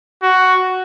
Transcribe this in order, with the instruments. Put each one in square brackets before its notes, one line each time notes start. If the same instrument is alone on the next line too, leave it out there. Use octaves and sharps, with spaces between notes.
[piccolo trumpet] F#4